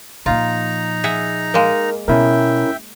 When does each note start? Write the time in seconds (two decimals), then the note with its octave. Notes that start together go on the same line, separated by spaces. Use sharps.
0.26 A#2 F3 D#4 F4 A#5
1.04 G#4 E5 F#5
1.54 G#3 A#3 A#4
2.08 B2 B3 C#4 E4 A#4 E5 G5